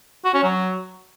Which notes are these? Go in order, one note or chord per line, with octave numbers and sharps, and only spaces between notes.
F#4
C#4
F#3